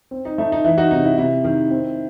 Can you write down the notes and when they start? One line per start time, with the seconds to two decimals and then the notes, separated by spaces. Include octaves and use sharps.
0.11 C4
0.25 D#4
0.38 A3 D#4
0.52 D#4
0.64 E3 E4
0.78 D#4 F#4
0.91 C3 D#4
1.04 E4
1.18 C3 E4
1.44 D#3
1.71 C4